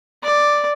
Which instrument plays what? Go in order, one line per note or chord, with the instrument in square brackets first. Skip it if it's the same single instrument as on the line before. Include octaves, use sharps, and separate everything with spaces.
[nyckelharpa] D5